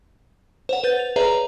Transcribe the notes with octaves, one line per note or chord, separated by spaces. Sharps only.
C5 C#5 F#5
B4 G6 A6
F7
G#4 B4 C#5 D5 E5 A#5